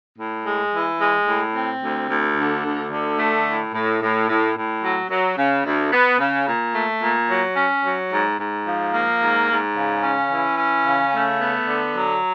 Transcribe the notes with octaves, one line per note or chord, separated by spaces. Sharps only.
A2
G#3
E3
G#3
A2
C4
D2
D2
D3
D2
D3
A3
A2
A2
A2
A2
A2
F#3
F#3
C#3
D2
B3
C#3
A#2
A3
A#2
F#3
C#4
F#3
G#2
G#2
F3
A#3
G#2
G#2
C#3
C#4
E3
C#4
C#3
A3
B3
D3
F#3